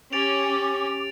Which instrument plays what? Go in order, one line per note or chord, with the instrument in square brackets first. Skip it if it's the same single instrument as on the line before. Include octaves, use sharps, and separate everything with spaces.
[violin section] C#4 [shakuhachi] G4 [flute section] D6 [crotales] A6 D7 F7